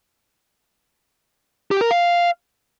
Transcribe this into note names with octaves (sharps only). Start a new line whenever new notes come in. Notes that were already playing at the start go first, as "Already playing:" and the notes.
G4
A#4
F5